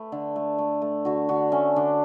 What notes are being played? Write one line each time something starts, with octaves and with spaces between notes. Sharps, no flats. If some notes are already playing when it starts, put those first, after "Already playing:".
Already playing: A3 B4
D3
A3
A3
A3
D3 F#4
D3 F#4
A3 C#4
D3 D4